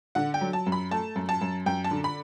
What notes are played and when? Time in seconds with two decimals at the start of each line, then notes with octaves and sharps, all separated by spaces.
0.15 D3 F#5
0.34 G5
0.41 F#3
0.53 A5
0.66 F#2
0.72 B5
0.91 A3 A5
1.16 F#2
1.29 A5
1.41 F#2
1.66 F#2 G5
1.84 A5
1.91 D3
2.04 B5